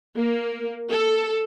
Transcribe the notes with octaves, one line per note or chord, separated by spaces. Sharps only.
A#3
A4